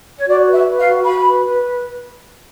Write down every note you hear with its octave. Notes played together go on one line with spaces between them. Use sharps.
C#5
F#4 D5
B4
E5
B4
F5
F#4
F#4 B5
B4
B4